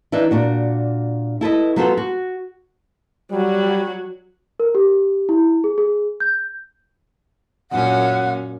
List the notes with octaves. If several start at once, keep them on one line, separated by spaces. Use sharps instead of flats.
E3 D4 D#4 E5
A#2 D4 F#4
E4 A4 B4 D#5
F#3 B3 F4 F#4 A4 C5
F#4
F#3 G3 F#4
A#4
G4
E4
G#4
G#4
G6
F#2 A#2 C#4 F#5